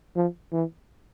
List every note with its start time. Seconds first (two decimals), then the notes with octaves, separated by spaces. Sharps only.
0.16 F3
0.52 E3